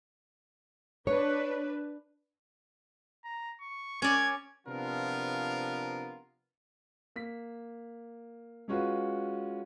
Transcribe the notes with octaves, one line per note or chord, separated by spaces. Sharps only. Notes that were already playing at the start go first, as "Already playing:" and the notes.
D4 B4 C#5
A#5
C#6
C#4 D5 G#6
C3 F3 B3 D4 F4 A#4
A#3 B6
G#3 C#4 F4 F#4 B4